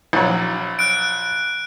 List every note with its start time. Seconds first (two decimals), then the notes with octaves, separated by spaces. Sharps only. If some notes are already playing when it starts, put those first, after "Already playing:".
0.13 A#1 F#3
0.79 F#6 D7